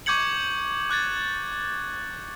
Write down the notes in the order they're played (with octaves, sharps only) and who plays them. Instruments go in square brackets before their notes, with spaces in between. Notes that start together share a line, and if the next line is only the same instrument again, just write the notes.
[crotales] C#6 D6 G6 G#6 C#7 F#7
D6 F#6 G#6 A6